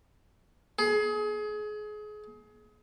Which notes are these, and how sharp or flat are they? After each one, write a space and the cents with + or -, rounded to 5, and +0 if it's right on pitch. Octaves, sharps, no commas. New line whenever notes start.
G#4 +30